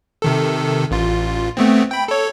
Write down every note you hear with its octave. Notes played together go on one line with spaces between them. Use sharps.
C3 D#3 A4
A1 F4
A3 B3 C4
G5 B5
A4 C#5